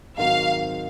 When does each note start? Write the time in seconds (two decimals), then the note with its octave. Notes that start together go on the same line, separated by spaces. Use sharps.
0.18 G#2 D#3 F#3 C4 F#4 F5